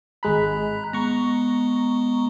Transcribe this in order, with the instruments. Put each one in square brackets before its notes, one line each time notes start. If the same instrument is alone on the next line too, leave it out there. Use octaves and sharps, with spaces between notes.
[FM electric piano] G#1 G#3 B5 [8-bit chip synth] A#5 F#6
[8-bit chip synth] G#3 B3 [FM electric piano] A#5 C#6